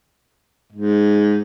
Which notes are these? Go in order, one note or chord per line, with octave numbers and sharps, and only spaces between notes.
G#2